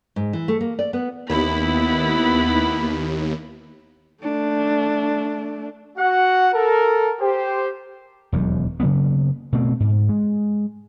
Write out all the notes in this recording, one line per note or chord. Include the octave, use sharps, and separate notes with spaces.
G#2
E3
A3
A#3
D5
B3
D#2 B3 E4 B5
A3 D4
F#4 F#5
A4 A#4
G4 C5
E1 D#2 F#3
C#3 F#3 A#3 B3
B2 A3 C4
G#2
G#3